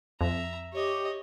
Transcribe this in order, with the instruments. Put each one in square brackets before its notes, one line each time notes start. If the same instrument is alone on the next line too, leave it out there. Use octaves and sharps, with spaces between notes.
[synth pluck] F2 [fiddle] E5 A#5
[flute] G4 [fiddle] C#5 D#5